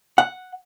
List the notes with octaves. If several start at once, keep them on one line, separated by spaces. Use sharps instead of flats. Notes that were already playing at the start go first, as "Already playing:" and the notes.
F#5